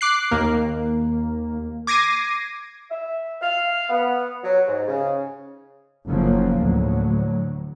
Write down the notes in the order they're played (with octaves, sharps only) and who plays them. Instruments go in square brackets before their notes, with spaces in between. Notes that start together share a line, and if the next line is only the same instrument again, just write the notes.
[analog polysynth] D6 F#6 C7
D#2 A#3
D6 G#6 A#6 C7 D#7
[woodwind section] E5
F5
B3
F#3
G#2
C#3
[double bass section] F#1 C#3 F3 F#3 A#3
D2 A2 F#3